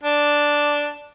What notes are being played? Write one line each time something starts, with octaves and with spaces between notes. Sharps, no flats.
D4